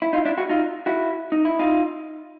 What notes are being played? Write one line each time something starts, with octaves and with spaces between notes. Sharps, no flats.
E4
D#4 F4
D4 E4
E4 F#4
D#4 F4
E4 F#4
D#4
E4
D#4 F4